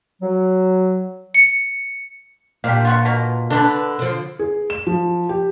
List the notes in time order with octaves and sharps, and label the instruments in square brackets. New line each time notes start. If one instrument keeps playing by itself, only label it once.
[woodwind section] F#3
[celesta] C#7
[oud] A#2 D4 [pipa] G4 F5
[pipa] F4 F#5 C#6
B2 A#3
[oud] D3 [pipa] D4 A4 B4
[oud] D3 F3
[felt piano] G#4
E7
F3
G4